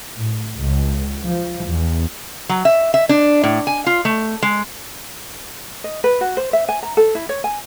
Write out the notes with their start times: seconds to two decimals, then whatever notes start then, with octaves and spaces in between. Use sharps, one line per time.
0.17 A2
0.59 C#2
1.24 F3
1.67 E2
2.49 F#3
2.65 E5
2.94 E5
3.09 D4
3.44 A2
3.67 G#5
3.86 F4
4.05 A3
4.42 G#3
5.84 D#5
6.04 B4
6.21 F#4
6.37 C5
6.53 E5
6.69 G#5
6.83 A#5
6.97 A4
7.15 E4
7.29 C#5
7.44 G#5